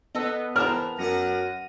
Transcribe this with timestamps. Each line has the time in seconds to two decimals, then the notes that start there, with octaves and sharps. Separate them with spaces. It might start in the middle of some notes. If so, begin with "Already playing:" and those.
0.15 B3 A4 B4 D#5
0.56 G#2 E3 C4 A#4 A5 A#5 F6
0.98 F#2 F#5 A#6 D#7